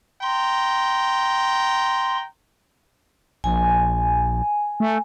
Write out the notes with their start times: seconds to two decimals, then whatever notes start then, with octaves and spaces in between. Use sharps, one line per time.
0.23 G5 A#5 C6
3.44 A#1 G#5
4.80 A3